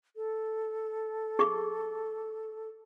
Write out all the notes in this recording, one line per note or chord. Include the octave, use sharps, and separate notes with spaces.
A4
G#4 C#6